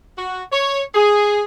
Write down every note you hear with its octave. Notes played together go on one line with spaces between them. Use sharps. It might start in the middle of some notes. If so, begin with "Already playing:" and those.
F#4
C#5
G#4